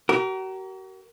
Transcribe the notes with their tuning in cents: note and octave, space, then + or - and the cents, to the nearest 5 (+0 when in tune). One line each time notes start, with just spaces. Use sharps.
F#4 +45 A#4 +0